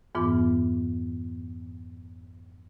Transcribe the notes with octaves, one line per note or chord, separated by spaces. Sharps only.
F2 G#2 E3 B3 F4 D6